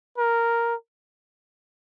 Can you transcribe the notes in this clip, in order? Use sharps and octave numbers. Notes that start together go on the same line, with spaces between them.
A#4